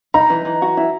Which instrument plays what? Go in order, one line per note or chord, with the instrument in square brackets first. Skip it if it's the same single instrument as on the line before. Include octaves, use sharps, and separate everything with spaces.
[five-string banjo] D#4 [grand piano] A#5
[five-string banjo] E3
E3
F#4
E4